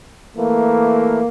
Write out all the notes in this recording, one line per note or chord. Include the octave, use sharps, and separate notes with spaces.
E3 A3 A#3